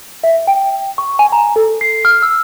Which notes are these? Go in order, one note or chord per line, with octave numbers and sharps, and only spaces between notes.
E5
G5
C#6
G#5
A#5
A4
C7
F6
E6